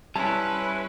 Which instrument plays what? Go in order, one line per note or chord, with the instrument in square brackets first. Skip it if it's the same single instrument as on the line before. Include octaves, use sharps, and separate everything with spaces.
[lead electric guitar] G3 E4 [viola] C#4 B4 [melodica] E5 G#5 C6 [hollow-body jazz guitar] A5